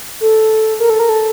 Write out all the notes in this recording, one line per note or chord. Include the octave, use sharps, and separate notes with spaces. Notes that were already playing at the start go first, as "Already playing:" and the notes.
A4
A#4
A4
A#4
A4